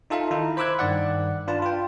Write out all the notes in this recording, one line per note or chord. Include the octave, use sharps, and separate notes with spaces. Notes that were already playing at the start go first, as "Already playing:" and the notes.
D#4 F4 A4 E5 F5
D#3 D#4 E4
C5 B5 D6 E6 F#6 G#6
G2 D#3 D5 F#5
D4 F4 B4 A5
F4 G5